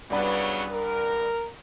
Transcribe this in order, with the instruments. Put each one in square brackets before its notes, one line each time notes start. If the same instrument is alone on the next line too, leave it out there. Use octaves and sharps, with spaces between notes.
[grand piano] C2 D4 B4 [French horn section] C#3 F#3 B3
[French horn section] A#4